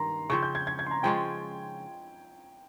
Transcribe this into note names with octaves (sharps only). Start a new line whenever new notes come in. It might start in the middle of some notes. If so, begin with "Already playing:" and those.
Already playing: G2 D#3 A#5 C6
C#3 F3 C4 C#6
G6
G#6
G#6
G#6
C6
A#5
F3 G#3 C#4 F4 G5